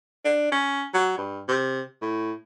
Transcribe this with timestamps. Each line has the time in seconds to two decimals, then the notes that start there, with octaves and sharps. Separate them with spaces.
0.25 D4
0.52 C#4
0.94 F#3
1.18 G2
1.48 C3
2.02 A2